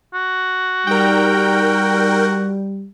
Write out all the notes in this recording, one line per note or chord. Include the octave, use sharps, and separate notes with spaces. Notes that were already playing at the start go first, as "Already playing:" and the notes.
F#4
G3 D#4 A#4 D5 G5